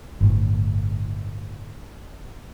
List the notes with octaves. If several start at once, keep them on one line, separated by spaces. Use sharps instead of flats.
G1 A2